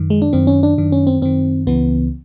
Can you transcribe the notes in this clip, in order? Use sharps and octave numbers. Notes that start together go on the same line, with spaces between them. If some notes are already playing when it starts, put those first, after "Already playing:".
Already playing: F#2 D#3
G#3
D4
F#2 D#3 C4
C#4
D4
F#2 D#3 D4
C#4
C4
F#2 D#3 C4
C#2 C#3 E3 B3